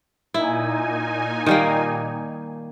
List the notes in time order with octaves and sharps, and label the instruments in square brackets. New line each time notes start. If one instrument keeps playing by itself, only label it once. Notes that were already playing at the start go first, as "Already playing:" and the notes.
[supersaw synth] A#2 D#4 G#5 [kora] E4
[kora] D#3 G3 A#3